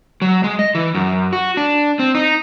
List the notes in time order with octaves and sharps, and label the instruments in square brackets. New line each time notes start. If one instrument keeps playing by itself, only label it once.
[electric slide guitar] F#3
G#3
D#5
E3
F#2
F#4
D4
C4
D#4